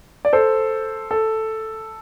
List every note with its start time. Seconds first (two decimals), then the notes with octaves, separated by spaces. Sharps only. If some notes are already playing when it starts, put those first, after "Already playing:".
0.25 D5
0.33 A4 C5
1.11 A4